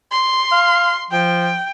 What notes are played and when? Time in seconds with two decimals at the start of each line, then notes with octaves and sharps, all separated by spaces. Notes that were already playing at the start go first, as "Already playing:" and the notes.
0.11 C6
0.52 F5
1.11 F3 G5